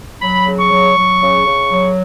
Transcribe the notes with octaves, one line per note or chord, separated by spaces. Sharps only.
F#3 B5
C#3
C#6
F#3
F#3
C#3
C#3
F#3